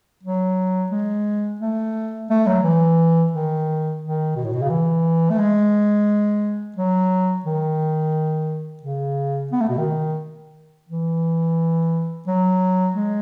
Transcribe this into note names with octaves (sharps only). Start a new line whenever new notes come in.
F#3
G#3
A3
A3
F#3
E3
D#3
D#3
B2
A2
B2
C#3
E3
A3
G#3
F#3
D#3
C#3
B3
A3
B2
D#3
E3
F#3
G#3